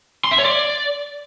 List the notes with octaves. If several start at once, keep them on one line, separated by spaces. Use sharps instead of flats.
C6
E5
C#5
D5